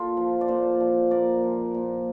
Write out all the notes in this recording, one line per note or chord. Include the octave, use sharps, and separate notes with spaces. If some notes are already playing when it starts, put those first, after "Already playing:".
Already playing: A#2 F4 A4
F3
D5
A#2 A4 C5
F3
A#2 A#4 D5
F3
A#2